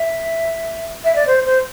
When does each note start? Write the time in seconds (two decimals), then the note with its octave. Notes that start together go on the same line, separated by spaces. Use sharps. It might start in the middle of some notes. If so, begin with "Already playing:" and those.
Already playing: E5
1.04 E5
1.16 D5
1.27 C5
1.46 C5